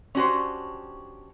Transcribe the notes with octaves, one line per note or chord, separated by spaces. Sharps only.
C#4 D4 F#4 G4 C5